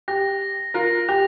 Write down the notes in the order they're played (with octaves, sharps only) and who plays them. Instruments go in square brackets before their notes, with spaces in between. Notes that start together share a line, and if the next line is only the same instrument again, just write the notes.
[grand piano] G4 [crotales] A#6
[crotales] A#6
[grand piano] F4 A#4 [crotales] A#6
[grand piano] G4 [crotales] F7